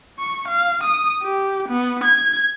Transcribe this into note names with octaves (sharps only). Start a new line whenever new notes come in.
C#6
F5
D#6
G4
B3
G#6